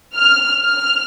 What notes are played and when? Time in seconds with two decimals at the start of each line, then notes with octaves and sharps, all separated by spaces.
0.15 F6
0.61 F6